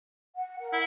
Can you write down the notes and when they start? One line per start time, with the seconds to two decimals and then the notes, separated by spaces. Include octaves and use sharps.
0.37 F#5
0.59 A#4 F#5
0.73 E4